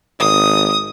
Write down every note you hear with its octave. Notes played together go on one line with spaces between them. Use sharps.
G#1 D#6